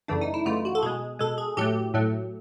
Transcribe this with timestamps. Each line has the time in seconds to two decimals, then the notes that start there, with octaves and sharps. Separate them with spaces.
0.08 F#2 C#3 E3 A3 D4
0.21 D#4
0.34 E4
0.45 F#2 C#3 E3 A3 F4
0.65 F#4
0.75 A4
0.82 B2 G#3 G#4
1.19 B2 G#3 A4
1.38 G#4
1.57 A2 F#3 A3 G4
1.94 A2 F#3 A3